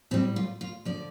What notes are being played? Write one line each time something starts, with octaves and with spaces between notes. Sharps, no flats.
A2 G3 C4
F4
F4
D3 F3 D5